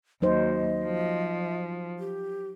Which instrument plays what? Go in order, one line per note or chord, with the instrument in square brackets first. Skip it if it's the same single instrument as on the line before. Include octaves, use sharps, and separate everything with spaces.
[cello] D#2 [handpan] F#3 D#4 C5 [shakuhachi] D#5
[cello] F3
[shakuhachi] G4